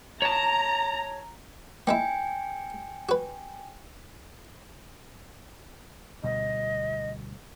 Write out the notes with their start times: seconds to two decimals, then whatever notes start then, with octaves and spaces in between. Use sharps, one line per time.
0.22 C#5 A5 A#5
1.87 A#3 D#4 E4 G5 G#5
3.09 F#4 B4
6.23 D2 B2 G3 D#5